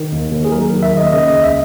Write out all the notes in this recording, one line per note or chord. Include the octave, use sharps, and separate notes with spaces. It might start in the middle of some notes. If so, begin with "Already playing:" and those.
Already playing: D#3
D#2
D#2
G#4
F#3 A#4
D#3
E5
D#2 D#5
C#3 D#5
D#5
C#2
E5